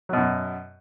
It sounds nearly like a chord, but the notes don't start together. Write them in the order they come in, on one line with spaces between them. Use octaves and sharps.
F#3 B2 F#2